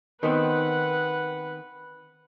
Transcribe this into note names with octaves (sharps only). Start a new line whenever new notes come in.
D#3 B3 C4 B4 F#5